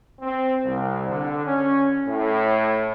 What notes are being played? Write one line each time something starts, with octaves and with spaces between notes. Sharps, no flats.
C4
C2
D3
C#4
A2